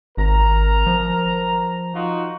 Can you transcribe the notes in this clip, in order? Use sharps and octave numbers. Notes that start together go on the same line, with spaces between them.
G#1 A#4 A#5
F3
D#4 F4 F#4